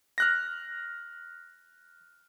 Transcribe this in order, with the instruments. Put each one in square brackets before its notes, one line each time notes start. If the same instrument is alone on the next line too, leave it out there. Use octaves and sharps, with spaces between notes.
[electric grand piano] F6 F#6 A#6